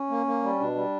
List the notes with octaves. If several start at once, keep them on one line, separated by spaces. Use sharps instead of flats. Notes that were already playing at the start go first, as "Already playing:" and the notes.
Already playing: C#4
A#3
A#3
G3
B2 D4
G3